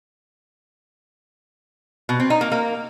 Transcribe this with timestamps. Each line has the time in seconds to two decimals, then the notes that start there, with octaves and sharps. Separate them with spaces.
2.09 B2
2.20 C4
2.30 D#4
2.41 A#3
2.52 A#3